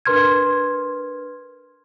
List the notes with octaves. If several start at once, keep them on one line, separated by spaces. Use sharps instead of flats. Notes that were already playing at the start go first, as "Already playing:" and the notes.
D4 A#4 B4 C6 F6 G#6